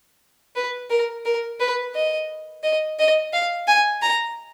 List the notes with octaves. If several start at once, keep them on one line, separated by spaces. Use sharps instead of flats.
B4
A#4
A#4
B4
D#5
D#5
D#5
F5
G#5
A#5